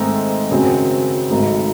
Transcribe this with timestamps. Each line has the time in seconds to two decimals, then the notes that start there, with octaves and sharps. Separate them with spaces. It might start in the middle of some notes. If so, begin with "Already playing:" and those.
Already playing: G#2 D#3 A3 C4 D#4
0.50 G#1 F#2 C#3 F#3 C4
1.30 G#1 G#2 F#3 A3 D#4